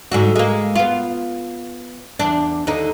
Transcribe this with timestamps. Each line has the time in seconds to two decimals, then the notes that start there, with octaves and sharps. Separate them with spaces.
0.11 G#2 D3 F#4
0.35 G#3 A#3
0.75 B3 F4
2.19 E2 D4
2.67 D#2 D3 D#4